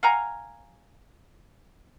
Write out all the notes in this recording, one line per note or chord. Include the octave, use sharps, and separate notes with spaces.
F5 F#5 G#5 A#5